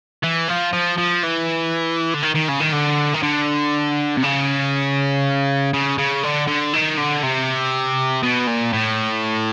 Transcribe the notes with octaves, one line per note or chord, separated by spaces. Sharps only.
E3
F3
F3
F3
E3
D3
D#3
D#3
C#3
D#3
D3
D#3
D3
C3
C#3
C#3
C#3
D3
D3
D#3
D3
C3
B2
A#2
A2